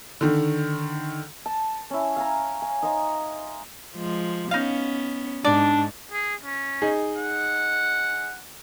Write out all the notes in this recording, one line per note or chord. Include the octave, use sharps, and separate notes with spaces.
D3 D#3
A5
C#4 E4
F5 G#5 A#5
G#5
D#4 C5 D#5 F5
F3 G#3
B3 C#4 D#4 F5
G#2 D4 D5
G#4
C#4
D#4 G#4
F#5